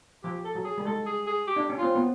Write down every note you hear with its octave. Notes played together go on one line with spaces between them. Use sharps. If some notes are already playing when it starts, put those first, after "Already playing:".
F3 G4
A4
F#3
G#4
G3
G#3 A4
G#4
G#4
G4
D4
C#4
C4 F4
B3